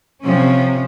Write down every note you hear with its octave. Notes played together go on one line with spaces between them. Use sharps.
C3 F3 C#4